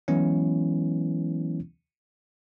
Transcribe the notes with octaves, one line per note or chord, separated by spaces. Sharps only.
E3 F#3 G#3 B3 C#4 E4